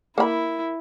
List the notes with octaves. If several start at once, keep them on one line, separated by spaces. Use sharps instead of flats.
A#3 E4 B5